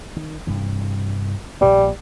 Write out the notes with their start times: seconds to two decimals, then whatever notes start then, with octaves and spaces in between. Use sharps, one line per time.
0.17 D#3
0.47 G2 C3 E3
1.61 A#1 A#2 G3 A#3